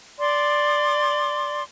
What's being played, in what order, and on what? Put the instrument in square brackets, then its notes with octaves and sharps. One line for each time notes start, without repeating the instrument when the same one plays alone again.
[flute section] D5 C6 D6